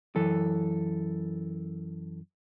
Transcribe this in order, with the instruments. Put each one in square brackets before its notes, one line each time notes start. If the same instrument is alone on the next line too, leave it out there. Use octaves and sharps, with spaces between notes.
[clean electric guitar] F#2 E3 A4